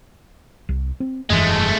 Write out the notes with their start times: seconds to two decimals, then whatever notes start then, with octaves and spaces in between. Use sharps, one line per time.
0.69 C2
1.00 C4
1.30 F1 G2 E3 G#3 A3